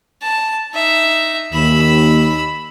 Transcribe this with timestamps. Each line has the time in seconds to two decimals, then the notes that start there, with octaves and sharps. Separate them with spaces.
0.22 A5
0.74 D#4 E5
1.54 D#2 B5 E6